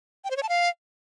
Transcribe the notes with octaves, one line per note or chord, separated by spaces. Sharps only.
G5
C5
C#5
A5
F5